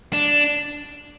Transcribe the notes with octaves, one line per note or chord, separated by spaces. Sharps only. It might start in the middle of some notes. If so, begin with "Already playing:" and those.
D4